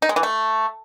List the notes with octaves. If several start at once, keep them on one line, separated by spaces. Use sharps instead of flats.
D#4
G#3
E3
A3